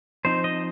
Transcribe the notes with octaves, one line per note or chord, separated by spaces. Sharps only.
F3 C4 D#4 C5
D#5